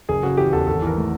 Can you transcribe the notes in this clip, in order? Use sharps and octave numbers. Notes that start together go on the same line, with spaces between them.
F#1 G#4
C#3 F#4
E3 G4
E2 A4
G#1 A4
E3 A#4
A3